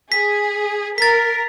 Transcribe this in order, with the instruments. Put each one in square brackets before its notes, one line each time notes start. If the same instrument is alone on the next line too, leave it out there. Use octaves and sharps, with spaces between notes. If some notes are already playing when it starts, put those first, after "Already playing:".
[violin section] G#4 [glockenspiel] B6
[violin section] A#4 [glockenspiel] A6 B6